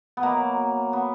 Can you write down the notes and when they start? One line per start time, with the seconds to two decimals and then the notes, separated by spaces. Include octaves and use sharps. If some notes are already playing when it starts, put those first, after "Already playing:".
0.17 B3
0.23 B2 F#3 A#3
0.93 B3